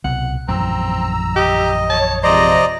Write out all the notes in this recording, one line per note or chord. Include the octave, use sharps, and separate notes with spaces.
C2 B2 F#5
A#1 F#2 E3 C4 A#5 E6
G4 D#5
C#5 A5
C3 F3 G#3 C5 D5 D#5 A#5